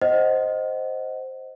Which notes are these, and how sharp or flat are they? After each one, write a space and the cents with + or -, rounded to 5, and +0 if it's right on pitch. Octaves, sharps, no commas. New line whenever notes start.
C5 +0 D#5 +0 F#5 +15